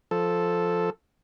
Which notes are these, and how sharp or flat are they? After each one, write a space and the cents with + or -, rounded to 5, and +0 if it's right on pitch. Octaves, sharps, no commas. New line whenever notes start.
F3 +0 A4 +0